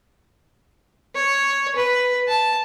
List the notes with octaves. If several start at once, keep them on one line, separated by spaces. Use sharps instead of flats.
C#5
B4
A5